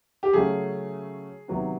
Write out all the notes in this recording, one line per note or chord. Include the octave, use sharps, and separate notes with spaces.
G4
C#3 F#3 A3 C#4 G#4
C3 D#3 F#3 B3